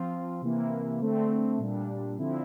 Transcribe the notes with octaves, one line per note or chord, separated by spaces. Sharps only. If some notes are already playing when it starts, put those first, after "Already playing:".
Already playing: F3 C4 F4
C3 E3 A#3 E4
D3 A3 C4
A#2 G3 D4
D3 F3 C4 E4